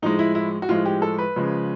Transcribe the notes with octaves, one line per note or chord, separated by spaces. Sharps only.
A2 F3 G#3 D#4
E4
E4
F#4
A2 F3 G#3 F4
G4
A4
B4
C#3 F3 G#3